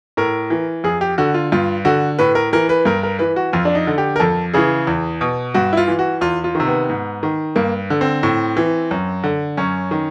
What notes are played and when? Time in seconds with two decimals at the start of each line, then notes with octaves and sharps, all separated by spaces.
0.17 A2 A#4
0.50 E3
0.84 F2 G#4
1.01 G4
1.18 D3 F#4
1.34 F4
1.52 G2 F4
1.85 D3 F#4
2.19 A2 B4
2.35 A#4
2.53 E3 A#4
2.69 B4
2.85 G2 A#4
3.03 A#4
3.19 E3 B4
3.36 F#4
3.53 F2 F4
3.65 D4
3.75 D#4
3.87 D3
3.98 G4
4.16 A#4
4.20 F2 A4
4.54 C#3 E3 G#4
4.87 E2
5.21 B2
5.54 G2 F#4
5.73 E4
5.77 F4
5.88 E3
5.99 F#4
6.21 E2 F4
6.44 F4
6.55 C3 D#3
6.66 B3
6.90 G#2
7.23 D#3
7.56 G2 A#3
7.90 D3
8.01 C4
8.23 A2
8.57 E3
8.91 F#2
9.24 D3
9.57 F#2 C#4
9.91 D#3